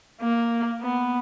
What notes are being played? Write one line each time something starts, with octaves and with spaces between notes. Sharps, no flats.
A#3
B3